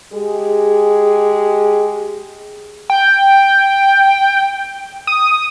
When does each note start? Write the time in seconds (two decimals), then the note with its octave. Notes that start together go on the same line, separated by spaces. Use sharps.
0.14 G#3 G4 G#4
2.90 G5
5.07 D#6